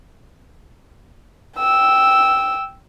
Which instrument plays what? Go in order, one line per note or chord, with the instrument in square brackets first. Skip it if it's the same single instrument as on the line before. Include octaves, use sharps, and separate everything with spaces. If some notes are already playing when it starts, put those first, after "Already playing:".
[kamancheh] G5 E6